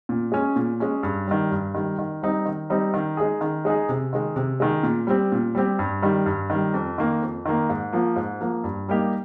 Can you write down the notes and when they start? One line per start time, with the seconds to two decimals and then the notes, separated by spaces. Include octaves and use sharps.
0.09 A#2
0.32 G#3 C#4
0.56 A#2
0.80 G#3 C#4
1.03 G2
1.27 D#3 G3
1.51 G2
1.75 D#3 G3
1.99 D#3
2.22 G3 C4 D#4
2.46 D#3
2.70 G3 C4 D#4
2.94 D#3
3.17 G#3 D#4 G#4
3.41 D#3
3.65 G#3 D#4 G#4
3.89 C3
4.13 D#3 G#3
4.36 C3
4.60 D#3 G#3
4.83 A#2
5.07 G3 C4 G4
5.32 A#2
5.55 G3 C4 G4
5.79 G2
6.02 D#3 G3
6.26 G2
6.50 D#3 G3
6.74 F2
6.98 D#3 A#3
7.22 F2
7.46 D#3 A#3
7.70 G#2
7.93 F3 A#3
8.16 G#2
8.41 F3 A#3
8.64 G2
8.89 G3 A#3 D#4 G4